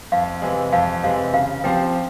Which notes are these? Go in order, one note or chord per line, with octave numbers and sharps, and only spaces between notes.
F2 F5
C3 E3 G#3
F2 F5
C3 E3 G#3 F5
C#3 F5
F3 C4 G4 G5